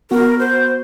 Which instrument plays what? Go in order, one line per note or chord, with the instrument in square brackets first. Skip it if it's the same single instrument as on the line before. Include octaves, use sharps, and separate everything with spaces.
[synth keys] B3 F#4 [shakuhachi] A#4
[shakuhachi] C5